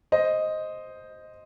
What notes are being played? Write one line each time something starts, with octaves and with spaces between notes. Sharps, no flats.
C5 D#5